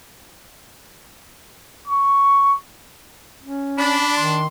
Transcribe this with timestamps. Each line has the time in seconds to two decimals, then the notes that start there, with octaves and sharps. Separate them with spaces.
1.88 C#6
3.41 C#4
3.78 D4 B5
4.17 D#3 C6